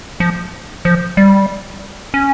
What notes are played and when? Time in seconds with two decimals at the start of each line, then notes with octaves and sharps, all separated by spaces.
0.20 F3
0.85 F3
1.17 G3
2.14 C#4